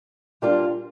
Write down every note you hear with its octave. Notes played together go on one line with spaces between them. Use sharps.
A#2 G3 A#3 D4 F4